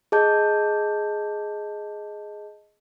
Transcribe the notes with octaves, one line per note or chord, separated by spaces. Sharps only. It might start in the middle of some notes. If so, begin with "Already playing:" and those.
G#4 D#5 A5 G6